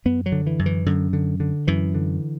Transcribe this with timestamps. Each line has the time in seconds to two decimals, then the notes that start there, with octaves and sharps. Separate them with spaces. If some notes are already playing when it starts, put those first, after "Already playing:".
0.05 F#2 B3
0.26 F#3
0.32 D3
0.47 E3
0.59 F#2
0.66 E3
0.86 F#2 D3
1.13 D3
1.40 D3
1.68 F#2 E3
1.94 D3